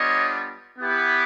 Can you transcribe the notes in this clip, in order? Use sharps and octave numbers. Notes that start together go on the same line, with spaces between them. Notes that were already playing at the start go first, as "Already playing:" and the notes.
Already playing: G3 B3 D4 F4 C#5 D#5
B3 E4 G4